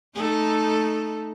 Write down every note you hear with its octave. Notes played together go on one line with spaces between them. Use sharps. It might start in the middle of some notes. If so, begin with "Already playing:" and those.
A3 D#4 A4